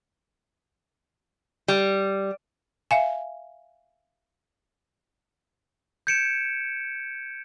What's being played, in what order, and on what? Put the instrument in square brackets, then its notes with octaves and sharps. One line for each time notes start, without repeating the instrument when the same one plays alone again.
[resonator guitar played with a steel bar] G3
[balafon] E5 F5 G#5
[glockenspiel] G6 G#6 C#7 D7 E7